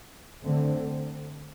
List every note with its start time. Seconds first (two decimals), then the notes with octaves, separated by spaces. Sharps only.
0.43 D3 A3 C4